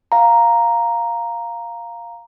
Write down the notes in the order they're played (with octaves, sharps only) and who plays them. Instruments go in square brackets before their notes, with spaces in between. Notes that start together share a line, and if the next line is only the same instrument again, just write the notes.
[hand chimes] F5 A#5